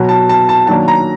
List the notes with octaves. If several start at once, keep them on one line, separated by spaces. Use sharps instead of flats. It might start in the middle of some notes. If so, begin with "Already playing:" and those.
Already playing: B2 F#3 B3
A5
A5
A5
D#3 F#3 A#3 D4 A5
A#5